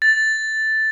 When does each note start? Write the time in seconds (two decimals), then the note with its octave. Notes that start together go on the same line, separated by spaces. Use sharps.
0.02 A6